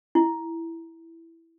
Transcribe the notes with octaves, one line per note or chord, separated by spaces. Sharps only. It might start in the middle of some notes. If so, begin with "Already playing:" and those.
E4